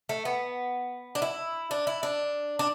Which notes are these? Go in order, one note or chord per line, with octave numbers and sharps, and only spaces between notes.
A3
B3
D4
E4
D4
E4
D4
D4